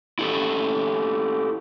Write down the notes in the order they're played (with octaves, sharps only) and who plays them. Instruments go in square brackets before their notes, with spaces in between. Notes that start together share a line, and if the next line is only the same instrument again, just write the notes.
[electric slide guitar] E4 G4 A4